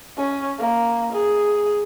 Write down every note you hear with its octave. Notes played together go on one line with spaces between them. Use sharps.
C#4
A#3
G#4